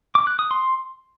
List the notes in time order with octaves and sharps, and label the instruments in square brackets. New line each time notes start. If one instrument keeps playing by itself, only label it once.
[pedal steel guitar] D6
F#6
D#6
C6